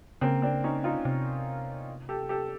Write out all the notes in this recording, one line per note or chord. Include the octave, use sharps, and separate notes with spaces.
C#3 A#3 C4
C4 D4
C#4 D#4
D#4 F4
C3
G4 A4
G4 A4